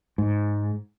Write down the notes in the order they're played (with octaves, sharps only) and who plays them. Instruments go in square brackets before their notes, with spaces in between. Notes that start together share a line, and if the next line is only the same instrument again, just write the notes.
[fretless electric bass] G#2